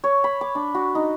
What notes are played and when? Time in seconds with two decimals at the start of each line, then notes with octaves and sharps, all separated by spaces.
0.04 C#5
0.24 B5
0.41 D6
0.55 D4
0.75 F#4
0.95 D#4